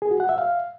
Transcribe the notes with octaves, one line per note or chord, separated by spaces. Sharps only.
G#4
F#4
F#5
E5
F5